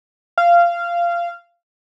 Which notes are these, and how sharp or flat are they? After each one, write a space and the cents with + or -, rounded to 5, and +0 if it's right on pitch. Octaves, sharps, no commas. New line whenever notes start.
F5 -15